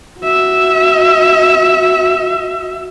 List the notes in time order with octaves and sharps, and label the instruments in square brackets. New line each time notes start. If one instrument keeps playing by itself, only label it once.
[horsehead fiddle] F#4 E5